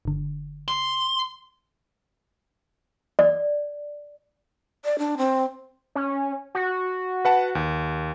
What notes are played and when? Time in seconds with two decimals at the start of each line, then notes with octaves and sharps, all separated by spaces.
0.05 G1 D3
0.68 C6
3.19 D5
4.85 D5
4.98 D4
5.18 C4
5.95 C#4
6.55 F#4
7.25 B4 F#5 A5
7.55 D#2